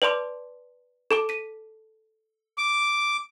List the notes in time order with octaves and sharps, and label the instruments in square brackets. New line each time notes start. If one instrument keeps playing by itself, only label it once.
[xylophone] B4 D5 A5 C6 D6
A4 A5 D6
B6 D#7
[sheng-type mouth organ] D6